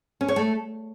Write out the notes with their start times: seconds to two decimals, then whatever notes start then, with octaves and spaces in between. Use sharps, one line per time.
0.21 C#4
0.28 C#5
0.36 A3